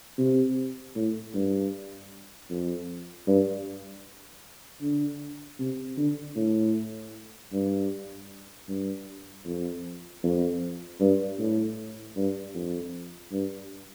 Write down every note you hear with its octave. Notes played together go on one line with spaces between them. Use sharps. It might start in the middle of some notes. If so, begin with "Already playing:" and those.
C3
A2
G2
F2
G2
D3
C3
D3
A2
G2
G2
F2
F2
G2
A2
G2
F2
G2